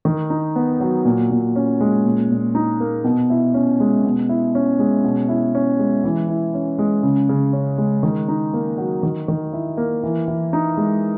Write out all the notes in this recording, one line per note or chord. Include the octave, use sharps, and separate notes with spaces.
D#3
D#4
B3
F#3
A#2
A#2
C#4
G#3
A#2
A#2
D#4
A#3
B2
E4
C#4
G#3
B2
E4
C#4
G#3
B2
E4
C#4
G#3
E3
E4
C#4
G#3
C#3
C#3
C#4
G#3
D#3
D#4
A#3
F#3
D#3
D#3
E4
A#3
E3
E3
D#4
G#3